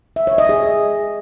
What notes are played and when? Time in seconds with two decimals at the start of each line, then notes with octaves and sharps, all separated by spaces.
0.16 E5
0.27 C#5
0.38 D#5
0.49 G#4